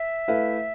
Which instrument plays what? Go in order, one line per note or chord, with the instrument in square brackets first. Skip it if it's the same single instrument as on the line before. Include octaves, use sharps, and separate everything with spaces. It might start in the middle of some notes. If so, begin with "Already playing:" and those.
Already playing: [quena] E5
[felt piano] A3 E4 B4 F5